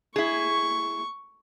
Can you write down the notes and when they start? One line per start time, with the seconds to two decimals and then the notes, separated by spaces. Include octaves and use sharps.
0.16 E4 G#4 C#6